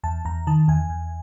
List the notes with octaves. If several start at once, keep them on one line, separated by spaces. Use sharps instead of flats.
E2 A5
E2 A#5
D#3 A5
E2 G#5
E2